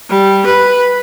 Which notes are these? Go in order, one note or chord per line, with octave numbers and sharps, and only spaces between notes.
G3
B4